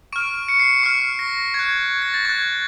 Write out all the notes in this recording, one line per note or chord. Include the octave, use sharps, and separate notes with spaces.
C#6 F6 D7
C#7
C7
C#7
C#6 F6 C7
A#6
C#6 F#6 G#6
A#6
A6
C#6 F#6 G#6